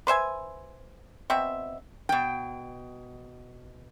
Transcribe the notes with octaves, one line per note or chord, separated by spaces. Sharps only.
B4 C5 E5 G#5
B2 C4 E5
B2 G5